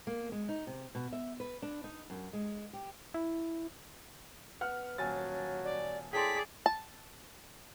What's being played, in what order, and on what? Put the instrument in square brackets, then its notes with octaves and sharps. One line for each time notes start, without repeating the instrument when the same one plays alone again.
[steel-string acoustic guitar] A#3
G#3
D#4
C3
B2
E5
B4
D4
D#4
F#2
G#3
G4
[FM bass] E4
[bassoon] B3 [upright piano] F#5 F6
[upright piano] D#1 G#5 A6 [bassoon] F#3
[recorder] D5
[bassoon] A2 [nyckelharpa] G#4 D5 [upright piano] G5 A5 C6 [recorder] B6
[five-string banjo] A5